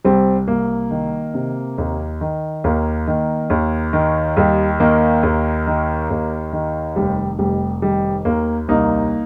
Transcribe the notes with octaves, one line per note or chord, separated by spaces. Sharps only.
C2 G3 C4
C2 A#3
D#3
C3
D#2
D#3
D#2 A#3
D#3
D#2
D#3
D#2 G3
D#3 A#3
D#2
D#3
D#2
D#3
F1 G3
F1 G3
D#3 G3
D#2 A#3
C2 A#3 D#4